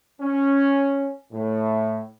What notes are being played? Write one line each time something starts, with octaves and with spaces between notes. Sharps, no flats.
C#4
A2